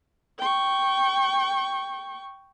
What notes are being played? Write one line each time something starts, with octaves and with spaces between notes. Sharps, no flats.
G5 C#6